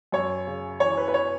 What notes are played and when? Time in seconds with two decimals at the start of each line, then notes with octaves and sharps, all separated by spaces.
0.12 F#2 C#5
0.47 C#3
0.80 E3 C#5
0.97 B4
1.08 B4
1.14 C#5